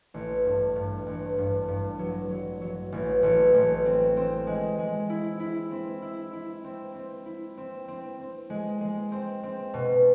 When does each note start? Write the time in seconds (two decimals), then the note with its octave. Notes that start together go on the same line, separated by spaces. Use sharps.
0.14 A1
0.45 G2
0.76 G2
1.06 A1
1.38 G2
1.68 G2
1.99 F#3
2.30 F#3
2.61 F#3
2.92 A1
3.23 A1
3.54 A1
3.85 C4
4.17 C4
4.47 G#3
4.78 G#3
5.09 E4
5.40 E4
5.71 C4
6.02 E4
6.33 E4
6.64 C4
6.95 C4
7.25 E4
7.57 C4
7.88 C4
8.19 C4
8.50 G#3
8.81 G#3
9.12 C4
9.43 C4
9.74 B2